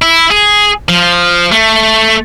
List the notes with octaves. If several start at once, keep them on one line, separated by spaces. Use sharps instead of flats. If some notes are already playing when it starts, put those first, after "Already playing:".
E4
G#4
F3
A3